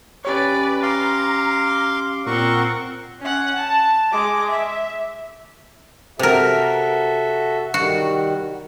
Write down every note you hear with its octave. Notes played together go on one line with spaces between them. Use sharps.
C#4 G4 B4 C#5 D5
F5 A#5 C6 D6
A#2 C4 A#4 F#5 C#6
C#4 F#5
A5
G#3 D6
E5
C3 F#4 A4 A#4 E5
D#3 G3 F#4